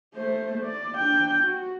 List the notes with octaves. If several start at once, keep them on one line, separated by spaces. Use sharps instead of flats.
A3 C5
D5
D4 G5
F#4